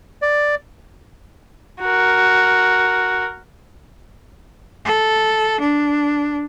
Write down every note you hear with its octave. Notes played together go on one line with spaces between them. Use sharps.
D5
F#4 A#4
A4
D4